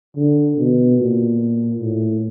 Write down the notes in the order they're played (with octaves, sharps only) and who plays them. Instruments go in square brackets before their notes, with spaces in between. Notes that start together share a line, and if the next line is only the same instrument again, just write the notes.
[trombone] D3
B2
A#2
A2